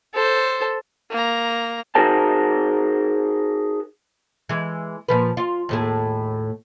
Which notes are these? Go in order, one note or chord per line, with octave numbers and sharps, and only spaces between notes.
A4 C5
A#3 A#5
D#4 F#4 G#4 A#4 C5 A5
E3 G#3
A#2 F3 B4
F4
D#2 A2 G#4